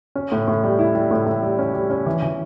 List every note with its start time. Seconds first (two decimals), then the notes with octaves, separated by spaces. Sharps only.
0.15 C#4
0.32 A2
0.48 A2
0.64 G3
0.79 E4
0.95 G3
1.11 A2
1.27 A2
1.43 G3
1.59 C#4
1.74 G3
1.90 C#4
2.06 E3
2.22 E3